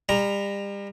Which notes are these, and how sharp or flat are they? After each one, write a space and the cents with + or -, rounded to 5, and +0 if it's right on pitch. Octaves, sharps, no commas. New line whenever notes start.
G3 +35 A#5 +0